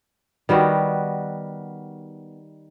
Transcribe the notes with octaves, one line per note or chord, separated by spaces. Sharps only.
D#3 G3 B3 F#4